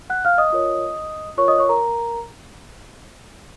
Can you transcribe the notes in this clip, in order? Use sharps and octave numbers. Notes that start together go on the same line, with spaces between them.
F#5 F#6
F5 F6
D#5 D#6
F4 A#4 C#5
F4 A#4 C#5 C#6
D#5 D#6
C#5 C#6
A#4 A#5